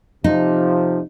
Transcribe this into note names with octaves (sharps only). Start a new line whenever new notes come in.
C3 F3 D#4